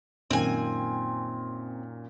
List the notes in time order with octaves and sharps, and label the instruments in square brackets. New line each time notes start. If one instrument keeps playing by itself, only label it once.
[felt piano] F#2 A#2 D#3 [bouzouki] C4 G#5